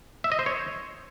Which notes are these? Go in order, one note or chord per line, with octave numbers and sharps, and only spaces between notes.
E5
D#5
C5
C#5